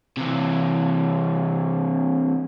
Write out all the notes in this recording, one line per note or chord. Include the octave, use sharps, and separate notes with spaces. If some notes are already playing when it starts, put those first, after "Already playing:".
C3 E3